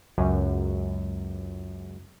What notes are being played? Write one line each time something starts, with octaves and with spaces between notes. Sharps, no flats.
C#2 F#2